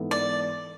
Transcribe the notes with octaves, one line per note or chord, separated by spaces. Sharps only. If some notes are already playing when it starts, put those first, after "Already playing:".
Already playing: G#2 E3 B3 E4 A4
D5